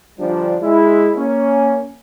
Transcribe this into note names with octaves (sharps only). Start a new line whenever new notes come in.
G1 F3 G3 D4
G#3 E4
A#3 C#4